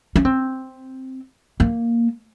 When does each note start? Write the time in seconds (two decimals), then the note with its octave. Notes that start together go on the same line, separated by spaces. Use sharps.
0.16 C#4
0.25 C4
1.60 A#3